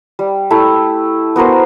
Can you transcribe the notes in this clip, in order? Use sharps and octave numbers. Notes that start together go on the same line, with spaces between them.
G3
A3 E4 G4
B3 F#4 A#4 C5